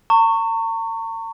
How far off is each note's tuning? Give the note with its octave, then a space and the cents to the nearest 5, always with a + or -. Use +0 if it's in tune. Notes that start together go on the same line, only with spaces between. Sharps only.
A#5 -45 C#6 +0